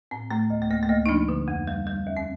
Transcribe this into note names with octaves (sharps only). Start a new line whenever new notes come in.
A2 C4
A2 A3
D2
A3
D2 A#3
A3
D2 A#3
D#4
F3 D4
D3
F2
G3
G3
D#2
C4